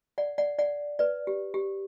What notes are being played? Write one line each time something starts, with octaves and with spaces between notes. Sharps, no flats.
D5 F#5
D5 F#5
D5 F#5
B4 D5
G4
G4